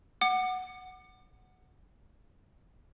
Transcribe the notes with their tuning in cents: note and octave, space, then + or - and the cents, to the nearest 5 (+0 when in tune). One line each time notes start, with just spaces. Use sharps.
F#5 +0 D6 +35